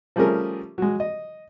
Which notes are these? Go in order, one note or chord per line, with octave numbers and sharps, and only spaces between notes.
F3 G3 A3 C#4 G#4 A#4
F#3 G#3
D#5